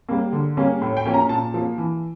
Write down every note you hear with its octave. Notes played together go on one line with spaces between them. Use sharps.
G3 A#3
D3
G3 A#3 C#4
A2
G5
F3 A#3 C#4
A#5
A#2 A5
F3 A#3
E3